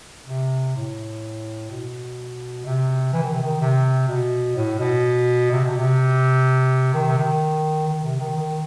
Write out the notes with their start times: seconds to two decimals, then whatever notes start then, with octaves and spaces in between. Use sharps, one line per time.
0.27 C3
0.76 A2
1.70 B2
2.65 C3
3.13 E3
3.23 D#3
3.32 C3
3.42 D#3
3.61 C3
4.08 B2
4.56 A2
4.79 B2
5.51 C3
5.64 B2
5.77 C3
6.94 D#3
7.07 C3
7.18 D#3
7.88 D#3
8.04 C3
8.20 D#3
8.37 D#3